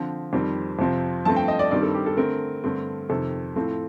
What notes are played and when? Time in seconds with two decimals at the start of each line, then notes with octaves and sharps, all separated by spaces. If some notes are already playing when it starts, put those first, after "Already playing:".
Already playing: D3 F3 C4
0.33 F2 D#3 G3 C4
0.79 F2 C3 F3 C4
1.25 G2 F3 A3 C4 A5
1.36 G5
1.48 D#5
1.59 D5
1.71 G2 D#3 G3 C4 D5
1.83 A4
1.94 G4
2.06 A4
2.17 D3 A3 C4 A#4
2.64 G2 D3 A3 C4
3.09 F2 C3 D#3 A4
3.56 A2 F3 A3 C4